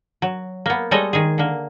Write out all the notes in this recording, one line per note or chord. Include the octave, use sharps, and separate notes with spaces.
F#3
A#3 B3
G3 G#3 A4 C#5 D#5
D#3 G#4
D3 A#3